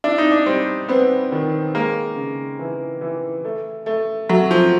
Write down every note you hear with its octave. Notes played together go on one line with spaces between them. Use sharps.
D4 E4
D#4
D4
G3 C4
B3 C4
D#3
G#3 A#3
C#3
E3
E3
A3
A3
F#3 A3
F3